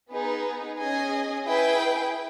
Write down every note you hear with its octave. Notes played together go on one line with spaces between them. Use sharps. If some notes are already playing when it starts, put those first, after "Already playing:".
B3 D#4 G#4 B4
C#4 G#4 D#5 G#5
E4 G#4 B4 G5